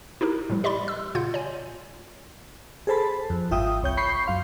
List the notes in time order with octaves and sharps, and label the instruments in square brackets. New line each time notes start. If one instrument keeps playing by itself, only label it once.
[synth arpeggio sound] D#4 E4 G4 A#4
A2 F3 G3
G4 D5 D#5 B5 C6
E6
A#2 C#3 F4 F#5 G6
C#5 D5 G#5
[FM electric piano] G#4 A4 C5 A5 B5
F2
G#1 F4 E5 G5 D#6
C2 C#5 G6
B5 C#6 G6 C7
F#2 F5 C6